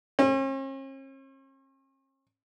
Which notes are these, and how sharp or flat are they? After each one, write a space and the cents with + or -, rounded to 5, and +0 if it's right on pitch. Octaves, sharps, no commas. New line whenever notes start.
C#4 -45